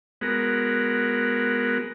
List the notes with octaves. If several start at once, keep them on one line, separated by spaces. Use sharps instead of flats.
G#3 B3 F#4 A#4